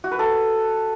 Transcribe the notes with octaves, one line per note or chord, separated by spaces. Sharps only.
F#4
B4
A4